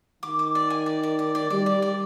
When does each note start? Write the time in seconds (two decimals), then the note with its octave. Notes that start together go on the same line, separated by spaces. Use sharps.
0.23 D#3 D6
0.39 D6
0.55 D5
0.70 G#5
0.86 D5
1.03 D5
1.19 D5
1.35 D5
1.50 G3 D5
1.66 D5
1.82 D5